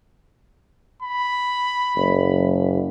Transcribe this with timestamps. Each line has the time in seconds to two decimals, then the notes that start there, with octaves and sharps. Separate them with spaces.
1.02 B5
1.96 F#1